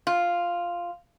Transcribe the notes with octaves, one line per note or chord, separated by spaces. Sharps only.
F4